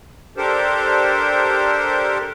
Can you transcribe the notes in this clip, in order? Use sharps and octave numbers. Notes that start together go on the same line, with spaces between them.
D4 G4 A4 A#4 C5